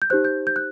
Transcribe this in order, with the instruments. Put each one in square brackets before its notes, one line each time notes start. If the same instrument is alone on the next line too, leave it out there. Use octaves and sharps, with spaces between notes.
[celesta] G6
D#4 G4 C5 F#6
G6
G6
F#6